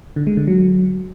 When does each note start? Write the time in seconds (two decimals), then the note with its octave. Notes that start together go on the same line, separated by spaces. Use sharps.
0.16 D3
0.27 G#3
0.37 D3
0.48 F#3